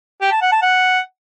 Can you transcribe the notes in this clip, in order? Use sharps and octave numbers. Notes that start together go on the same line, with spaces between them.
G4
A5
F#5
A5
F#5